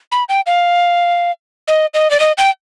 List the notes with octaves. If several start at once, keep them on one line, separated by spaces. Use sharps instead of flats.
B5
G5
F5
D#5
D#5
D5
D#5
G5